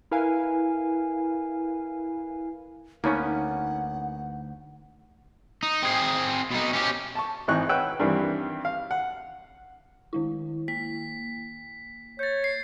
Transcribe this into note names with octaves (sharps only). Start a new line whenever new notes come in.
E4 A#4 B4 F5 G#5
D2 A#3 B3 C#4 D#4 C#5 F#5 C#6
D#4
C4 G#4
B2 D#4
C#4 G4
A5 C#6
G#1 E3 C4 D#4 C#6 F#6
B4 C#5 F#5 G5 E6 F#6
G2 D#3 E3 G3 C4
F5
F#5
D#3 G#3 E4
A#3 B6
C#5 G6 A6
C7